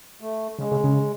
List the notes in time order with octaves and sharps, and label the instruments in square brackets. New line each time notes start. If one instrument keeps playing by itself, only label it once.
[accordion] A3
[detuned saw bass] C#3 [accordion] G#3
[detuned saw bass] C#3
C#3